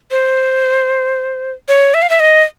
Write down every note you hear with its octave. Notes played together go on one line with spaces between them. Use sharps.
C5
C#5
E5
F5
E5
D#5